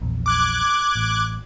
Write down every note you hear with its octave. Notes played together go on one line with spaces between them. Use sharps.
A#1 E2
D6 F#6 G#6
A1